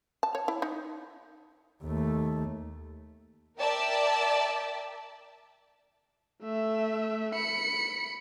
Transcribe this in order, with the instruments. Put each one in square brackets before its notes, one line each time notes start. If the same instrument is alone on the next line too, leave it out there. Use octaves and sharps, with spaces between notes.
[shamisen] A5
C#5
E4
D#4
[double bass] D#2 A3
[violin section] A#4 D5 E5 G5 A5
[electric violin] A3 E5
B5 C#7